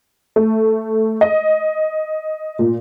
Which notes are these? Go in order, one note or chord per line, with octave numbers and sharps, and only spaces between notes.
A3
D#5
A#2